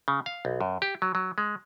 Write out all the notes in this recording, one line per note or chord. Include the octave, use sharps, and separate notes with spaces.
C#3
F5
B1
F#2
G4
F#3
F#3
G#3